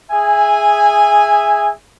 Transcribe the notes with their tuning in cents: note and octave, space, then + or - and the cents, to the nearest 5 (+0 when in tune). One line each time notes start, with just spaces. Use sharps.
G#4 +0 E5 +0 G#5 -15